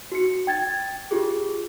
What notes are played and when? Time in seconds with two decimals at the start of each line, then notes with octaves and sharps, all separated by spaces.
0.12 F#4 C#7
0.47 G5 G#6 A6
1.11 F4 G4 G#4